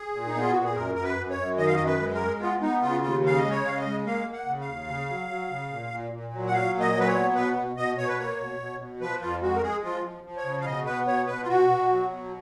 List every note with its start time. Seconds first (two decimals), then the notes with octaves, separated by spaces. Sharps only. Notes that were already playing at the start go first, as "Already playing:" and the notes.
Already playing: G#4
0.13 A#2
0.27 D#4
0.35 B3 F4
0.52 A#2 F#4
0.64 G#4
0.75 F#2 A#4
0.95 F#2 A#4
1.03 B4
1.17 F#2
1.30 C#5
1.37 F#2
1.58 D#3 D#5
1.66 F5
1.75 D#5
1.78 F#2
1.86 B4
1.99 G#3
2.14 A#4
2.21 G#3
2.40 B3 F4
2.61 B3 D#4
2.81 C#3 F4
3.02 D#2 F4
3.23 C#3 F5
3.37 D#5
3.44 G#3
3.51 C#5
3.64 C#3 F5
3.77 D#5
3.85 G#3
4.06 A#3 F5
4.27 A#3
4.33 F#5
4.46 C#3
4.61 F5
4.68 D#2
4.88 C#3
5.08 F#3
5.29 F#3
5.50 C#3
5.70 A#2
5.91 A#2
6.12 A#2
6.33 F#3
6.47 F#5
6.52 F#3 F5
6.74 A#2
6.80 D#5
6.94 F#3
7.00 B4
7.08 C#5
7.15 B3
7.35 B2 B4
7.56 B2
7.76 B2 D#5
7.97 B2 C#5
8.08 B4
8.18 A#3 C#5
8.39 B2
8.60 B2
8.79 B2
9.01 F3 B4
9.21 F2 F4
9.41 G#3 F#4
9.55 A#4
9.62 G#3 G#4
9.83 F3 F4
10.04 F3
10.24 F3
10.37 C#5
10.44 C#3
10.61 F5
10.65 B2 D#5
10.85 B3 B4
11.06 B2 C#5
11.27 B2 B4
11.43 F4
11.48 B2 F#4
11.69 B2
11.89 F#3
12.10 B2